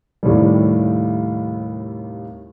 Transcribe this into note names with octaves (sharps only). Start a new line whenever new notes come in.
D#2 A2 C3 G3